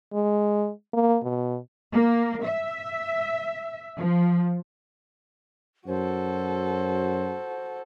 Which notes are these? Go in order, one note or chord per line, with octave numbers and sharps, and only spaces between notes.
G#3
A#3
B2
A#3
E5
F3
F#2 F#4 A4 C5